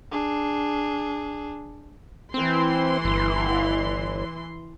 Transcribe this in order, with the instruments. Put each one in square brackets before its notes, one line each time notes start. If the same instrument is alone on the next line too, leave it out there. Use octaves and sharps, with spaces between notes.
[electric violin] D4 G#4
[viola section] E3 C6 [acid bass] C4
[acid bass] G1